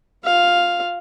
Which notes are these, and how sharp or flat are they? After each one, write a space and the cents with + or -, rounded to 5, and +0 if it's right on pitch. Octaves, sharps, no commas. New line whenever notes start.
F4 +15 F5 +0